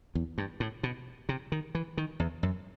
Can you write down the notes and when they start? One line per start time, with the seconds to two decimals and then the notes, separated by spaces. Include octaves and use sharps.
0.15 E2
0.38 G2
0.60 A2
0.83 B2
1.29 C3
1.52 D#3
1.75 E3
1.97 D#3
2.20 E2
2.43 F#2